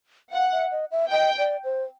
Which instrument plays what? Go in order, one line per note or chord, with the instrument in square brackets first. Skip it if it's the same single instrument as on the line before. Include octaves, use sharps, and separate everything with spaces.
[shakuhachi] F5 [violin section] F#5
[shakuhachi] E5
D#5
E5
[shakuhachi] D#5 [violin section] G5
[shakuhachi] D5
C5